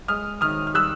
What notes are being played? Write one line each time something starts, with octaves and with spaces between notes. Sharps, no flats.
G#3 D#6 F6
D#3 D#6 F6
F6
G3 E6 F#6